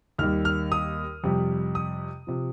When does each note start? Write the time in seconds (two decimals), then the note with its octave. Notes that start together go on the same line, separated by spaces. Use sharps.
0.19 D#2 D#3 G3 F6
0.45 F6
0.72 D#6
1.24 F2 C3 G3
1.75 D#6
2.27 C3 F3